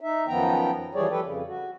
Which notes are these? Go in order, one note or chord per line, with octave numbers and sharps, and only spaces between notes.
D#4 E5
F#2 D#3 F3 B3 G5 A#5
E3 F3 G3 G#4 C#5 D5
F3 G3 G4 A4 B4 G5
F2 C#3
F#4